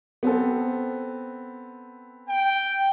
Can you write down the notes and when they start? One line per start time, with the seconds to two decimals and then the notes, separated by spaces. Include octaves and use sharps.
0.23 B3 C4 A4
2.29 G5